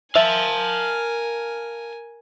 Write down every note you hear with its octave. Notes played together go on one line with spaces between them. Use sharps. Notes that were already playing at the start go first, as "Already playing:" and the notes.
A#4 E5 F5 G#5 A5